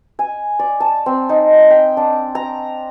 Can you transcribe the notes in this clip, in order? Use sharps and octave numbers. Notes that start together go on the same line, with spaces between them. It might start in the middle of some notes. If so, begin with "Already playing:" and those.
G#5
D5
A5
C4
D#4
G5
D4
A#5